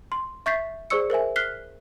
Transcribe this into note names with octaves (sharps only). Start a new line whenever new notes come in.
C6
E5 C#6 G6 A6 B6 C7
G#4 C5 D5 C#6 E6 C#7
A#4 C5 E5 G#5
F6 F#6 B6 C7 G7